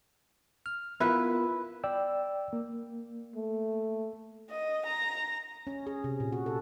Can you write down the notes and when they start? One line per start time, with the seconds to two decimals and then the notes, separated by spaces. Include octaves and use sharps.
0.66 F6
1.00 B3 E4 F4 A#4 B4
1.84 D5 G5 E6
2.53 A#3
3.36 A3
4.50 D#5
4.86 A#5
5.67 C#4
5.87 G#4
6.04 C3
6.20 A#2
6.32 F#4
6.46 A4